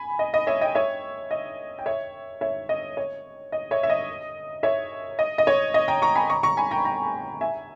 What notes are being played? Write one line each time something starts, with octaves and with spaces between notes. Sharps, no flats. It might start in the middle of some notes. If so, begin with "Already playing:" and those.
Already playing: G#5 B5
D#5
D#5
C#5 E5
D#5 G5
C#5 E5
D#5
G5
C#5 E5
C#5 E5
D#5
C#5
D#5
C#5 E5
E5
D#5
C#5 E5
D#5
D#5
C#5
D#5
G5 A#5
A#5 C#6
G#5 B5
A#5 C#6
A#5 C#6
G#5 B5
G5 A#5
G5 A#5
E5 G#5